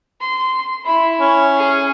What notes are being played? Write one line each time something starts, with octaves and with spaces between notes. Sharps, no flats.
C6
E4 B5
C#4
G#4